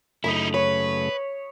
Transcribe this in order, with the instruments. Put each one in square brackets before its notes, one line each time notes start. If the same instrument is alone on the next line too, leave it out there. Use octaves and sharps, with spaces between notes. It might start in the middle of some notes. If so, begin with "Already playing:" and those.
[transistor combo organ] F#2 C#3 A3 [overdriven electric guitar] D#4 E4 [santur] B5 D#6
[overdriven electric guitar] B4 [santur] C#5